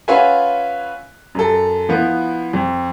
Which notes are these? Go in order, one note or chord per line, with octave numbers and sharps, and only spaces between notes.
C#4 F4 B4 E5 F#5 G#5
F#2 A4
F3 B3 E4
F2